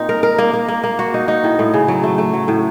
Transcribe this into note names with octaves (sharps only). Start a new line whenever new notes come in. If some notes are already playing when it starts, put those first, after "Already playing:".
Already playing: A#2 C4 D#4
A#4
A#4
A#3
A#3
A#3
A#3
F#4
D#4
D#4
A2
A2
C#3
F#3
A3
A3
F#3
A2